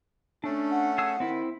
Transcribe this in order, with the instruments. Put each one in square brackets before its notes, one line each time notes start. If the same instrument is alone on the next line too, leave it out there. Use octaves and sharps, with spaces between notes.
[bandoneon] A3 C#4 A4 [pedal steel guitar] D4
[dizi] F#5
[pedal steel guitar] G#4 E6
[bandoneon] D#3 [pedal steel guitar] C4 E4